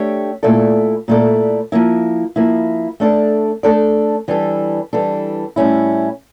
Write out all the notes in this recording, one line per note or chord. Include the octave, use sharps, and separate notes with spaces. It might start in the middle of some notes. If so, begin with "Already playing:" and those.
Already playing: A3 D4 G4 C#5
A#2 A3 E4 A4 D5
A#2 A3 E4 A4 D5
F3 A#3 E4
F3 A#3 E4
A3 D4 A4 D5
A3 D4 A4 D5
E3 G3 D4 A4
E3 G3 D4 A4
A2 G3 C#4 E4